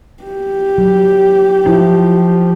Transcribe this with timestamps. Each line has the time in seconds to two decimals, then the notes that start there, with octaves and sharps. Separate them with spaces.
0.23 G4
0.78 F#3
1.66 F3 E4 F4